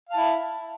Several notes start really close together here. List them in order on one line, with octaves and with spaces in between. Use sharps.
F5 A5 E4